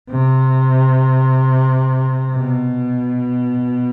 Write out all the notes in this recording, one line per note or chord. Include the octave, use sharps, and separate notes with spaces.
C3
B2